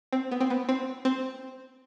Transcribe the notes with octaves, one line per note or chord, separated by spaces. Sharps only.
C4
B3
C4
B3
C4
C4